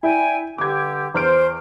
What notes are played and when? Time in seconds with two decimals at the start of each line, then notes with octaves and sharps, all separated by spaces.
0.03 E4 D5 G5 G#5
0.58 G2 D3 G4 D6 G#6
1.14 E2 C5 F6 D7